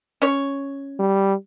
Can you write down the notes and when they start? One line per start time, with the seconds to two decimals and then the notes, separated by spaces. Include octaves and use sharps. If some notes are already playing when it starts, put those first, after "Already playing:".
0.22 C#4 C#5
0.99 G3